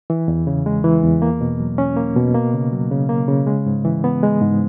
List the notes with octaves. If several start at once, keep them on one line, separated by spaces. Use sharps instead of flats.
E3
E2
C#3
G#3
E3
E2
A#3
B2
F#3
C#4
A#3
B2
A#3
C#3
F#3
C#3
A#3
C#3
G#3
G#2
E3
B3
G#3
G#2